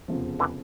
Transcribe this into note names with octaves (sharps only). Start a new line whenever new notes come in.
F1 E2 C#3 F3
D3 E3